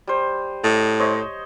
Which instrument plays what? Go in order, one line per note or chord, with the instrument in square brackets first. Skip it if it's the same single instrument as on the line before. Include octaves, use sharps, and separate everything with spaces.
[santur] G3 C5
[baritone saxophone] A2 [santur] D#5
[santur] C5 C#5 D#5